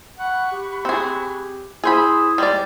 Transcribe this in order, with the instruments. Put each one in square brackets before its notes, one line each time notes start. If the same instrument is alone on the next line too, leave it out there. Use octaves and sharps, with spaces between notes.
[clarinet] F#5 [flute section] B5 C#6 F#6
[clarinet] G4
[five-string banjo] C4 G#4
[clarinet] E4 [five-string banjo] G#4 C5 B5 [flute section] C6 D#6 E6
[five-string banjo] G3 G#3 D5